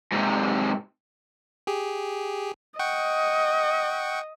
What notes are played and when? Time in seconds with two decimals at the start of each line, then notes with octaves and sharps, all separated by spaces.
0.12 G#2 C3
1.67 G4 G#4
2.79 D#5 F#5 G5 C#6